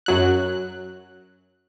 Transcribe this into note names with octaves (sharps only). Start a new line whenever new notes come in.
F#2 F#3 F#6